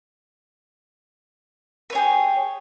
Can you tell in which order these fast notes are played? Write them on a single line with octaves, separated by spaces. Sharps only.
B4 C#5 G#4 G4